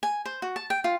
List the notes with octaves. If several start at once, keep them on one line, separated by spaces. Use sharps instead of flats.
G#5
C5
F#4
A5
G5
F4